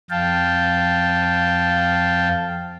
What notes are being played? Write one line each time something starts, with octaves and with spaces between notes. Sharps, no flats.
F2 F5 G5 A5